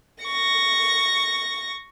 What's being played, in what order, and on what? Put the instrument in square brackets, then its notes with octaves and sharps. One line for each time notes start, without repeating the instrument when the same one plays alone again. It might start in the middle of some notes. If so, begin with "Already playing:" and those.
[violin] C#6 A#6